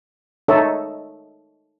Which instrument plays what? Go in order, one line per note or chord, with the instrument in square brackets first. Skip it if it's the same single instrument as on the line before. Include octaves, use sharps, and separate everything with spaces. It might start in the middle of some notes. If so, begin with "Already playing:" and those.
[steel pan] D#4 A4 C#5 D#5 E5